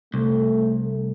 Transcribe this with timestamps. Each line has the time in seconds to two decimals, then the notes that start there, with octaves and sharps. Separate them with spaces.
0.14 C2 A3